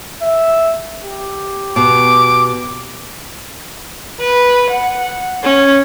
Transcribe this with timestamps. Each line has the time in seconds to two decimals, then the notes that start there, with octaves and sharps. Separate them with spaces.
0.22 E5
1.03 G4
1.76 B2 D6
4.20 B4
4.71 F#5
5.43 C#4